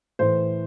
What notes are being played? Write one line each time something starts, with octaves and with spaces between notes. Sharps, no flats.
A2 E3 C5